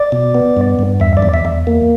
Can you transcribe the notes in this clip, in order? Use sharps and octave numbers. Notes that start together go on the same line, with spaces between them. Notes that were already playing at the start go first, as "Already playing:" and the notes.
Already playing: D5
B2
B3
G2
G2
E2 E5
D5
E2
E5
E2
A#3